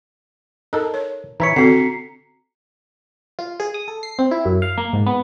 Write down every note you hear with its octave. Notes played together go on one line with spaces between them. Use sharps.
D#4 A4 A#4
C#5
E3 E4 C#5 A#5 B6 C#7
D3 C4 F#4 A4 C7
F4
G#4
D#6
A4
C7
C4
E4
F#2
F5
A#3
G#2
B3